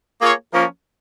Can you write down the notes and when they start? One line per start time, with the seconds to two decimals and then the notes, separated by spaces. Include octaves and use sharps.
0.21 A#3 F4 G#4 C#5
0.53 F3 A#3 C#4 F4 A#4